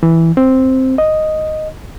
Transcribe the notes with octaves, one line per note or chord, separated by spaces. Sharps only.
E3
C4
D#5